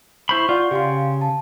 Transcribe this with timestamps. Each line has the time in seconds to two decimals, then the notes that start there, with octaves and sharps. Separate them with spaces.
0.29 E4 C5 B5 C#6
0.49 F4 D5 F#5 G6
0.71 C#3 G4 F5 C6
1.21 A5